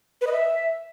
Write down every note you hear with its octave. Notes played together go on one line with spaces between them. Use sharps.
B4
D#5
E5